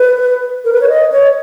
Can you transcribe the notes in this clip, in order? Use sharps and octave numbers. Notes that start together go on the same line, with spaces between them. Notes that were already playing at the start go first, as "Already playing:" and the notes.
Already playing: B4
A#4
B4
C#5
D#5
C#5